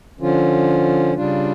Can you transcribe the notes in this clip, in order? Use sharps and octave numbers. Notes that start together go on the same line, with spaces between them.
D3 F3 C#4 F4
C#3 G3 D4 F4